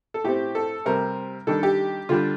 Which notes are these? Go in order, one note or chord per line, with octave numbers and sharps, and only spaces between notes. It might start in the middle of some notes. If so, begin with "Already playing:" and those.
A4
A2 A3 C4 G4
A4
C3 G3 C4 A#4
D#3 G3 D4 A4
G4
D3 G3 D4 F4